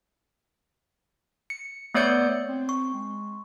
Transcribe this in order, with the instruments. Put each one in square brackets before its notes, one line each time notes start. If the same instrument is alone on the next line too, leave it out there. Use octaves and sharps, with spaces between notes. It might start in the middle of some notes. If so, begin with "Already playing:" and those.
[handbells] C#7
A3 B3 C#5 D5 G6 C#7
[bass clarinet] C4
[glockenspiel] C#6
[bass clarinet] G#3